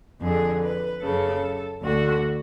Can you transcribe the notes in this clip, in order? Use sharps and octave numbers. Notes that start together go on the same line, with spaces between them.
F2 D3 G#4
B4
F#2 C#3 A4
D2 D3 F#4